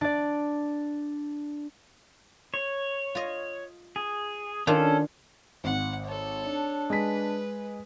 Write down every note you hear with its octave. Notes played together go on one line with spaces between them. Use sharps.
D4 D5
C#5
F4 D#5
G#4
D#3 C#4 D4 F4 A4
G#1 F#5
A4 C#5
D4
G#3 B4 B6